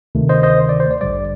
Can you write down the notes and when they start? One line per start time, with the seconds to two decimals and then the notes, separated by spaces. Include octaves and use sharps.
0.15 D2 C3 D#3 A3
0.29 C5 D#5
0.43 C5 D#5
0.69 D5
0.80 C5
0.91 D5
1.01 A1 G2 D3 G3 D5